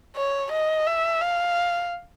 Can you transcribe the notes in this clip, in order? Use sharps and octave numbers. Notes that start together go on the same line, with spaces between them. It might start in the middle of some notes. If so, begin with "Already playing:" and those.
C#5
D#5
E5
F5